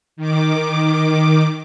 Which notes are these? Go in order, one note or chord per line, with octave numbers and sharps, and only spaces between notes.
D#3 D6